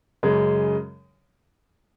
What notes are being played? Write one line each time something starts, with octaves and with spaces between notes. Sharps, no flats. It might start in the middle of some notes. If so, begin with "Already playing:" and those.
F#2 C#3 G#3